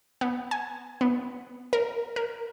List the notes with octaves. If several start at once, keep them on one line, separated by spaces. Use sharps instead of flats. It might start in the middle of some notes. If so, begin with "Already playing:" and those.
B3
G#5
B3
A#4
A#4